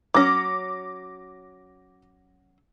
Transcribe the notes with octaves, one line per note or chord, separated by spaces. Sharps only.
F#3 C#4 D6 A#6